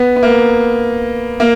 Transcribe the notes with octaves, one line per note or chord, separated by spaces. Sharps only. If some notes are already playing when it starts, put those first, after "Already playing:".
Already playing: B3
B3
A#3
A#3